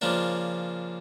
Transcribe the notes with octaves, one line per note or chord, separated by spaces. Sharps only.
C#3 F3 A#3 D4